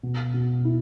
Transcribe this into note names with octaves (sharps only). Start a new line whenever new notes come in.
B2
B2
E4